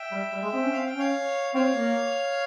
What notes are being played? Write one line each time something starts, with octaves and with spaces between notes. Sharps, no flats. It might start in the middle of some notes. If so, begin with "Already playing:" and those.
Already playing: E5 G5
G3
G3
G#3
C4
C#4
C4 F5
G5
C#4
C#5 F5
C4 C#5 F5
A#3